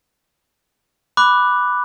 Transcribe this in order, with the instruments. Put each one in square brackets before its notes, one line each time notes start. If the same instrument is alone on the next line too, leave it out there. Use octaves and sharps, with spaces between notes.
[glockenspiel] B5 D6 F#6